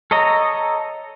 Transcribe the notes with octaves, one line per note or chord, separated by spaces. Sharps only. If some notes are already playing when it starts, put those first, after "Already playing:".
A4 C#5 D#5 A#5